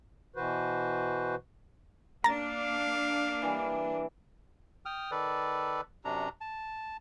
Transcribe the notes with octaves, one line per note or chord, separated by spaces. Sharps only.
B2 E3 F#4 B4 C5
A#3 D4 F5 A#5 A6
E3 G3
G5 D#6 F6
D#3 A4 B4 D5
F#2 C3 D4 A#5
A5